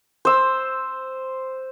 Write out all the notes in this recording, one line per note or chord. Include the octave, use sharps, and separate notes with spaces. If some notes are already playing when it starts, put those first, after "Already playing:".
C5 E6